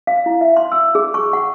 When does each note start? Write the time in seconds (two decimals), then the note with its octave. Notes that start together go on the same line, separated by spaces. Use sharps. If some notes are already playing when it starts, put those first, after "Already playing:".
0.07 F5
0.26 E4
0.41 E5
0.57 C6
0.72 E6
0.95 G#4
1.14 C#6
1.33 F#5